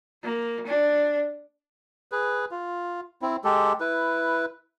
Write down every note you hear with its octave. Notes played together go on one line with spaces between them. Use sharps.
A#3
D4
G#4 B4
F4
C4 E4
G#3 G4 A4
E4 B4